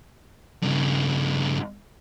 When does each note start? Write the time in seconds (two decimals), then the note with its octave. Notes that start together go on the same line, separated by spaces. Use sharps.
0.62 G2 C#3